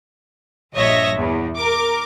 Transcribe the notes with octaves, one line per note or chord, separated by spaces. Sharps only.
A#1 G2 C#5 D#5 E5 A#6
E2
A#4 D6